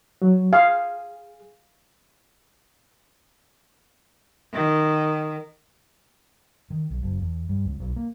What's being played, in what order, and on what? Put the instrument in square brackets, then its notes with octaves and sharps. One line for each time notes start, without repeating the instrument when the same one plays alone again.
[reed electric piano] F#3
[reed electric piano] G#4 [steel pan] F5
[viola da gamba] D#3
[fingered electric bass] D#3
B1
F#1
E2
G2
C#2
B1
A#3